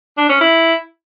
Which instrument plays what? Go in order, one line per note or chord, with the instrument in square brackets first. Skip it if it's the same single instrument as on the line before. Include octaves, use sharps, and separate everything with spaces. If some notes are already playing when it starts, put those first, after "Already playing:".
[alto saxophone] D4
C#4
E4